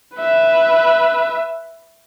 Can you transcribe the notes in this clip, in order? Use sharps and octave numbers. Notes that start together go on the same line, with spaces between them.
B4 E5